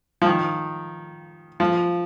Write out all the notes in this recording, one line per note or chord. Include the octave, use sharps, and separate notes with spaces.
F3
D#3
F3